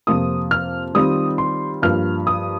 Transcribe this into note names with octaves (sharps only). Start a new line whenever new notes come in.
F2 C3 F3 A#3 F4 D#6
F6
D#3 G3 C4 F4 D#6
C6
G2 F3 A#3 F4 F6
D#6